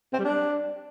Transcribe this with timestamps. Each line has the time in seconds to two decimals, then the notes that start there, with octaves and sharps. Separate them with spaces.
0.13 C4
0.19 G3
0.25 D4